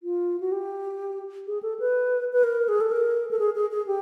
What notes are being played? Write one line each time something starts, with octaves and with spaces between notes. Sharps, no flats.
F4
F#4
G4
G#4
A4
B4
B4
A#4
G#4
A4
A#4
A4
G#4
G#4
G#4
G4